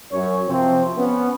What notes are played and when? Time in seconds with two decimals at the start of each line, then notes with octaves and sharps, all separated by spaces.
0.12 F#2 C#5
0.48 C3 F3 C4
0.97 B3 C#4